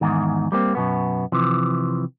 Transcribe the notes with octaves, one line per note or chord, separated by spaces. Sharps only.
E2 G#2 D#3
G3 A#3 C4
F#2 B2 B3
C3 E3 F3